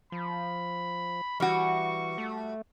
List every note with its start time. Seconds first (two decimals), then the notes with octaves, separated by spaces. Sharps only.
0.12 F3 B5
1.40 E3 G3 F#4 C#6
2.18 A3